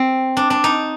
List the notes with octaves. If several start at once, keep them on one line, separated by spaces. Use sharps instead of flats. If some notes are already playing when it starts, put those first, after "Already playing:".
Already playing: C4
D4
D4
D#4